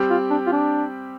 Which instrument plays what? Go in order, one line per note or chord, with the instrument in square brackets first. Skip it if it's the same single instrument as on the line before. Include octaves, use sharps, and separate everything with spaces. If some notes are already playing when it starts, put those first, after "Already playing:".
Already playing: [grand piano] G3 C4 G4
[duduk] F4
D4
F4
D4